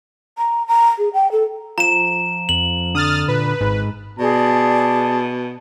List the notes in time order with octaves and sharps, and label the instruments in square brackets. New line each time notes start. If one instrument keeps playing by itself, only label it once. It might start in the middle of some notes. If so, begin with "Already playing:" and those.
[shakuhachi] A#5
A#5
G#4
G5
A4
[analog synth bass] F3 [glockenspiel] A#5 E7
[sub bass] F2 [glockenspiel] F#7
[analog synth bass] D3 [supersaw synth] D#6 F6 A6
[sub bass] A#2 [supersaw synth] B4
[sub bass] G#1 [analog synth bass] G#2
[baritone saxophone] B2 [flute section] G#4 D5 [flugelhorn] A5